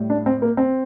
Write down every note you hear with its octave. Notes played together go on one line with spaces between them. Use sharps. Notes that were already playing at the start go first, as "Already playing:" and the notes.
Already playing: A2 G3
D4
C4
A#3
C4